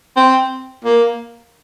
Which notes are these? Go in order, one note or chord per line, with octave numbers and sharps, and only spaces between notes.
C4
A#3